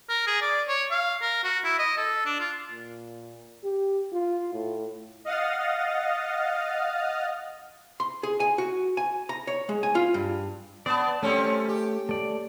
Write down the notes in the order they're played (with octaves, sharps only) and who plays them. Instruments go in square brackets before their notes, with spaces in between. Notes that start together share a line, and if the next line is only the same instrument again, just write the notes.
[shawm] A#4
G#4
D5
C#5
F5
A#4
F#4
E4
D#5
A4
D4
F4
[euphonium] A#2
G4
F4
A2
[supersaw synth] D#5 F5 F#5 D#6 F6 A6
[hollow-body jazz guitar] C6
G#4
G#5
F#4
G#5
A#5
C#5
G#3
G#5
F4
G2
[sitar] B3 [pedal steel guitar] D5 A5
[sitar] G3 C4 C#4 [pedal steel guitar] A3
[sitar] G4
[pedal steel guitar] A3 D5